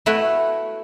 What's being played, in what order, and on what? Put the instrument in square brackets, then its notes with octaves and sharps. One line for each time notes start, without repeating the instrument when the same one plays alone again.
[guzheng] A3 E4 F#4 B4